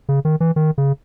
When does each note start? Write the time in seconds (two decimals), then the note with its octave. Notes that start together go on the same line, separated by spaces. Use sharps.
0.09 C#3
0.25 D#3
0.40 E3
0.56 D#3
0.78 C#3